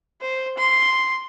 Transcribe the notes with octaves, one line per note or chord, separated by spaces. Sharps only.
C5
C6